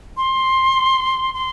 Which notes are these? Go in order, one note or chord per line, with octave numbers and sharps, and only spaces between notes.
C6
C6